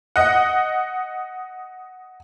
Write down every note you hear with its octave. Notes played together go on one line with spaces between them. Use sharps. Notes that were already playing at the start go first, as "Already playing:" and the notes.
D#5 F#5